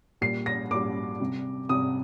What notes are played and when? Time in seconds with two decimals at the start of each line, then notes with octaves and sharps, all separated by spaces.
0.21 A#2 G3 C7
0.46 A#6
0.71 A#2 G3 D6
1.20 C3 G3
1.69 C3 G3 D#6